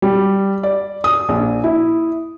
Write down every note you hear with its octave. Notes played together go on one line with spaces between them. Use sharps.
G3
D5
D#6
A#1
E4